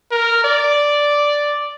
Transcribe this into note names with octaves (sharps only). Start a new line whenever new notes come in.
A#4
D5